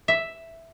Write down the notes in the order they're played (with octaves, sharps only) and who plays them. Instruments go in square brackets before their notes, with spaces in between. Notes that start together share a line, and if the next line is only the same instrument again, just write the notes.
[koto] E5